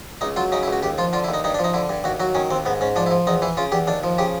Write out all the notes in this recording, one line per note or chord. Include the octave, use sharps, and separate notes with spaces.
C#2 D#4
F#3 F4
C#3 D#4
E4
C#2 F#4
D#2 G4
F3 F4
D3 F4
E4
D#2
D#4
G2 D#4
D4
F3
D#4
D3 E4
G2
D#2 F#4
F#3 F#4
D#3 C#4
D#2 C4
G#2 B3
G#2 C#4
F3 D4
E4
F3
E2 D#4
E3 E4
C#3 F4
E2 G4
D#2 D4
F3
C#3 G4